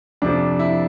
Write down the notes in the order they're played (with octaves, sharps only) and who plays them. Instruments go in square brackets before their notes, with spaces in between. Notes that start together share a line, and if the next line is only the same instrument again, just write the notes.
[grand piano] F2 C3 F3 D4
E4